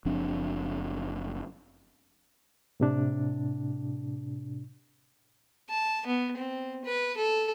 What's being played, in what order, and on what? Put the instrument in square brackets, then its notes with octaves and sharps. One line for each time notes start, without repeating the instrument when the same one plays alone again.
[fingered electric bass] F#1 F3 C4 D4
[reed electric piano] A2 C3 D4
[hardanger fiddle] A5
B3
C4
B4
A4